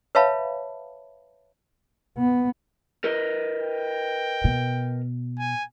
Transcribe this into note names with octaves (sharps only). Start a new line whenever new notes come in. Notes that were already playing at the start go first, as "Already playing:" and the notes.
B4 C#5 E5 F5 A5 B5
B3
A#4 B4 D#5
G5
B2
G#5